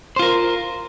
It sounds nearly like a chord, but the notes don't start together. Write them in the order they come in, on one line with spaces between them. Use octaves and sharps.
C5 F4 A#4